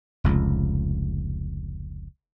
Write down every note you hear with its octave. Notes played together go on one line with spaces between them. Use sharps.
F1 C#2